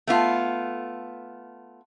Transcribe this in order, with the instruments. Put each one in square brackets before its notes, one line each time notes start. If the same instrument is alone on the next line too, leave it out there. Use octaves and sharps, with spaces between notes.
[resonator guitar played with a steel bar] A3 B3 F4